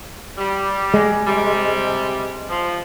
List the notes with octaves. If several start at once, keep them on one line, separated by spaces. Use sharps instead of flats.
G3
G#3
C3 G3
F3